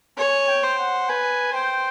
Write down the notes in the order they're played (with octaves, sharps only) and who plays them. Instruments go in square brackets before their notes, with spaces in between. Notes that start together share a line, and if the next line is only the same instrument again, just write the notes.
[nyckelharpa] C#5 [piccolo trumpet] G#5
[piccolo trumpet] G5
[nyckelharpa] C5
[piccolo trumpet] F#5
[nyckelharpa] B4 [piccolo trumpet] G#5
[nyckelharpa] C5 [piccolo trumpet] G5